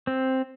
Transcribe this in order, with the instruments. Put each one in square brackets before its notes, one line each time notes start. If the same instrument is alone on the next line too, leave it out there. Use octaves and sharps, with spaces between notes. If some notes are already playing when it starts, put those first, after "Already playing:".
[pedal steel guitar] C4